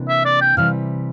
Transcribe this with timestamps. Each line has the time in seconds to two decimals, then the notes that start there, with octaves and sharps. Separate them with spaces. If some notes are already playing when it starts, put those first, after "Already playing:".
Already playing: C3 E3 A#3 D4
0.09 E5
0.25 D5
0.41 G5
0.57 C3 E3 G3 F5